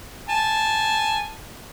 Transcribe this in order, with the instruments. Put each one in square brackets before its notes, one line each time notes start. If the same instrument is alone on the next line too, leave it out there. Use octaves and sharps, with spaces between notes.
[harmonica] G#5 A5